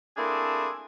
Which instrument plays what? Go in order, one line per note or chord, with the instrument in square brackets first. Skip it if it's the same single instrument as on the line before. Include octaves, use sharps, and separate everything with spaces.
[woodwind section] A3 A#3 C4 D4 E4 G#4